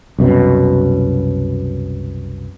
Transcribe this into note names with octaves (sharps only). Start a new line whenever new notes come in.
C2 F#2 B2